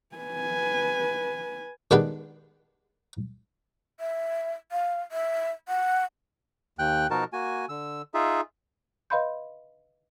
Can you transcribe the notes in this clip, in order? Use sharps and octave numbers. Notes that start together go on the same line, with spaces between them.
B4 G#5
D#3 G#3 B3 D4 G4 B4
E5
F5
E5
F#5
D#2 G5 F#6
B2 F3 D#4 F#4 A#4 A5
A#3 F#4 G#5
D3 E6
D#4 F4 G#4 E5
B4 D#5 F5 B5 C6 G6